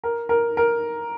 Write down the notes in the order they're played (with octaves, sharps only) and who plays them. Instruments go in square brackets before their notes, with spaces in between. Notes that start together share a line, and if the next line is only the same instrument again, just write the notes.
[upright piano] A#4
A#4
A#4